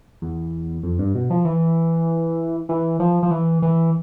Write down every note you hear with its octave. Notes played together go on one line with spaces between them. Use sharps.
E2
F2
G2
B2
F3
E3
E3
F3
F3
E3
E3